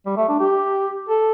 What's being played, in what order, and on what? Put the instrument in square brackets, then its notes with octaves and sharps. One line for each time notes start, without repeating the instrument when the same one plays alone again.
[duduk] G3
A3
D4
G4
A4